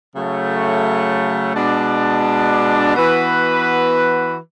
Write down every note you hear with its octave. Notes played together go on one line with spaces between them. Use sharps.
C#3 F#3 A3
B2 G#3 D4
E3 B3 F#4 B4